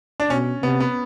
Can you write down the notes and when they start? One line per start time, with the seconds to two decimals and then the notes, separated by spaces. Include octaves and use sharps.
0.20 D4
0.30 B2 C#4
0.63 C3 B3
0.80 B3